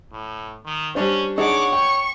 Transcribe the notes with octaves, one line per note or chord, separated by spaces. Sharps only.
A2
D#3
G3 C#4 D4 C5
D4 D#4 G#4 C#5 F#5 D6
G5 C#6